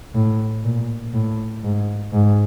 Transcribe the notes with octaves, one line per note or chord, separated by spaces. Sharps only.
A2
A#2
A2
G#2
G#2